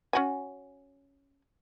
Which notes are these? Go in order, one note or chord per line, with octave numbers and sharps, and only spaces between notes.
C#4 F#4 G#5